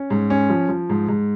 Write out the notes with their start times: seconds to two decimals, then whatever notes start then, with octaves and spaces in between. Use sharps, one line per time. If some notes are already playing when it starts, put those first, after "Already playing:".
Already playing: C#4
0.10 G#2
0.30 C#4
0.50 F3
0.69 F3
0.89 G#2
1.08 G#2